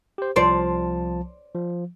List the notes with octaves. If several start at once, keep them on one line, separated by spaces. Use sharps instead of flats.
G4 C5
C2 F3 C5 D5 A5
F3